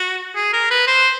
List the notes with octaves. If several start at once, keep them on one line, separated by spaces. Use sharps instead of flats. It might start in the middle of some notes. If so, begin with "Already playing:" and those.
Already playing: F#4
G#4
A#4
B4
C5